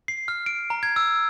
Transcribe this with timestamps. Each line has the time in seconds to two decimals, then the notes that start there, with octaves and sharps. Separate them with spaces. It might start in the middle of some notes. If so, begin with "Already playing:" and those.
0.08 C7
0.28 F6
0.46 D7
0.70 A#5
0.83 G#6
0.96 E6